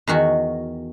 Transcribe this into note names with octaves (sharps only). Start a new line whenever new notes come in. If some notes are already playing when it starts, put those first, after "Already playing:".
E2 D#3 F#4